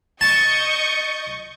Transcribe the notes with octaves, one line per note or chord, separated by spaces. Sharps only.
D#5 A5 C#6 G6